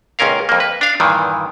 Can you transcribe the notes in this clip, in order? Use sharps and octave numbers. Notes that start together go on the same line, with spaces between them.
C#2 A#2 C#4 A#4 F5
F2 A#3
B4
D4 F5
G2 A#2 D#3 E3